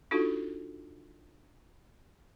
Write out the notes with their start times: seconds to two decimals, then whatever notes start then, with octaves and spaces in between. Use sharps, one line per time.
0.11 D4 D#4 F4 F#4 A4